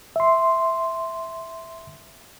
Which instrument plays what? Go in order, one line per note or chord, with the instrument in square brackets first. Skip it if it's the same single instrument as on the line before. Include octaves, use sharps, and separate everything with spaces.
[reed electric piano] E5 C6